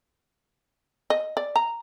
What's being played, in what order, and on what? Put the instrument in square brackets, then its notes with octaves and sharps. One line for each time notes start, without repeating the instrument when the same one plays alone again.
[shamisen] D#5
D5
A#5